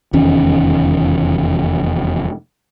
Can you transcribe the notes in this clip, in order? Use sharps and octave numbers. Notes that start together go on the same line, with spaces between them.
F1 E2 D#3 C#4